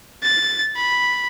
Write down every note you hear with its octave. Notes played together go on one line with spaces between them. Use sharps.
A6
B5